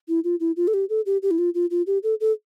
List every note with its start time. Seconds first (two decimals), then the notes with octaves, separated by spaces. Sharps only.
0.08 E4
0.24 F4
0.40 E4
0.57 F4
0.68 A4
0.74 G4
0.90 A4
1.06 G4
1.23 G4
1.31 E4
1.38 F4
1.55 F4
1.71 F4
1.87 G4
2.03 A4
2.21 A4